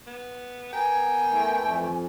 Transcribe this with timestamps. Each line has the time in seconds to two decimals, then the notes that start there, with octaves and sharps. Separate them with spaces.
0.07 B3
0.73 B3 A#4 G5 G#5
1.30 E3 A3
1.62 F2